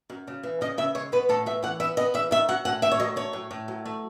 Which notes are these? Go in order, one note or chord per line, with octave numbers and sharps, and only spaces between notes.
F#2
C#3
E3
C#3 D#5
C#3 E5
G#3 C#5
B3 B4
A2 A4
A2 E5
E3 F#5
B3 E5
B3 D#5
E2 E5
D#3 E5
F#3 F#5
A2 F#5
A2 E5
C#5
F#3 D#5
A3 C#5
A2
A2
F#3
A3